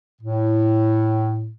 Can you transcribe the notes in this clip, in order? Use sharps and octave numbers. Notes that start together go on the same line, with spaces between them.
A2